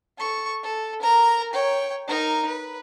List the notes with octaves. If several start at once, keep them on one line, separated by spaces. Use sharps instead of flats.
A4 C#6
A4
A#4 A#5
C#5 G5
D#4 A#4
B4